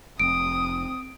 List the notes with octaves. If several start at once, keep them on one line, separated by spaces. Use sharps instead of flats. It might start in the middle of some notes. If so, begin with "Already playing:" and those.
F1 C4 D#6 D7